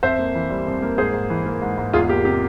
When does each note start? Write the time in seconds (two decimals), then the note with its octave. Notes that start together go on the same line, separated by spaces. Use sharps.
0.03 F2 C5 E5
0.19 A#3
0.35 E3
0.50 G3
0.67 F2
0.82 A#3
0.98 G#2 G#4 C5
1.14 G#2
1.30 E3
1.46 A#3
1.62 G#2
1.78 G#2
1.93 E2 F4 G#4
2.09 A#3 G4
2.25 C3 G4